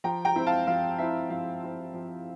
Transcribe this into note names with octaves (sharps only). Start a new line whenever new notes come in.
F3 G5 A#5
G5 A#5
C4 E4
F5 A5
F3 F5
C4 E4 E5
F3 F5
C4 E4
F3